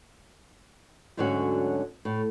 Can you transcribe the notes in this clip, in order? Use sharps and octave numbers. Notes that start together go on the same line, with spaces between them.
D2 G#2 D3 F#3 C#4 F#4
A2